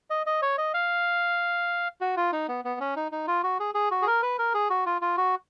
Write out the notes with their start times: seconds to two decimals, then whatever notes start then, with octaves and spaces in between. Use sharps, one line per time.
0.10 D#5
0.26 D#5
0.42 C#5
0.58 D#5
0.74 F5
2.01 F#4
2.17 F4
2.32 D#4
2.48 B3
2.65 B3
2.80 C#4
2.96 D#4
3.12 D#4
3.27 F4
3.43 F#4
3.60 G#4
3.75 G#4
3.91 F#4
4.02 G#4
4.07 A#4
4.22 B4
4.39 A#4
4.54 G#4
4.70 F#4
4.86 F4
5.02 F4
5.17 F#4